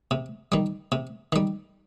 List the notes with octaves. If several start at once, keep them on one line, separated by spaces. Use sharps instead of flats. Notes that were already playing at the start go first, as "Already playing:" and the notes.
C3
D#3 G3
C3
D#3 G3